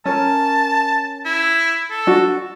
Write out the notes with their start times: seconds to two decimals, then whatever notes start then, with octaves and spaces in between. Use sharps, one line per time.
0.05 C#4 A#4 A5
1.25 E4
1.90 A4
2.07 D4 F#4